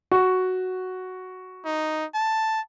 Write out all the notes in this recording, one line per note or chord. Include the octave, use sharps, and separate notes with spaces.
F#4
D#4
A5